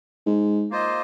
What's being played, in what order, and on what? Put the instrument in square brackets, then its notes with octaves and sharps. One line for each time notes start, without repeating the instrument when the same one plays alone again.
[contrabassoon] G#2
[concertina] A#3 F4 C5 D#5